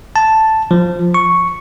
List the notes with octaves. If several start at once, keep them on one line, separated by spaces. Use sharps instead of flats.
A5
F3
C#6